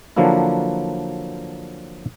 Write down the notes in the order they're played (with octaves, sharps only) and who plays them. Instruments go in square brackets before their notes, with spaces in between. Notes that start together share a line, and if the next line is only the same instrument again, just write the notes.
[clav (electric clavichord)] D3 F3 F#3 A#3 D4 E4